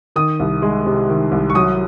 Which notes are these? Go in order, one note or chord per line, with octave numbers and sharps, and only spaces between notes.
D#3 D#6
C2
G#3
C3
D#3
C2
C#6
F#3 D#6